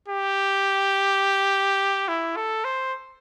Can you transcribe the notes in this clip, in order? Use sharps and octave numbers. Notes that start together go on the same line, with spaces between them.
G4
E4
A4
C5